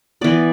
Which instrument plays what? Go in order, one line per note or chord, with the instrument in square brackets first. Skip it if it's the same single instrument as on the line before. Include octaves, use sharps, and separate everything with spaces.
[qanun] E3 B3 D5